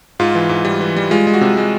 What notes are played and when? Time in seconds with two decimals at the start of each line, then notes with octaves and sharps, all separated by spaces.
0.20 G#2 F4
0.35 E3
0.49 G#2
0.65 G3
0.81 E3
0.96 G3
1.11 G#3 F4
1.27 G#3
1.34 F#4
1.41 C3
1.57 G#3